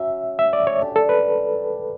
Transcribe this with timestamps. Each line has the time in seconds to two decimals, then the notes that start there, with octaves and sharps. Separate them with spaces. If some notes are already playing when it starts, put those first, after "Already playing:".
Already playing: F#3 C#4 E5
0.39 E5
0.53 D5
0.67 C#5
0.81 A3 D4 G4
0.96 A4
1.09 B4